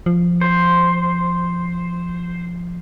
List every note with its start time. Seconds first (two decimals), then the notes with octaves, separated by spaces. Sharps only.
0.06 F3
0.41 C5